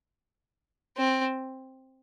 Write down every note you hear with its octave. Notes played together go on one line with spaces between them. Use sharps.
C4